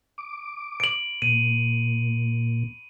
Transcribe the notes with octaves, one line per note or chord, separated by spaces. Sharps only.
D6
D7 F#7
A#2 D#7